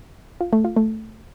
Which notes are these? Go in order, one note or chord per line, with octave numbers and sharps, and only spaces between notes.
F4
A3
F4
A3